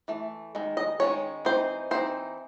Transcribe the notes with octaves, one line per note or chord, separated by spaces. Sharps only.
E3 A3
D#3 G#3
D#5
D#3 G#3 C#4 C#5
E3 C4 D#4 C5
E3 C4 D#4 C5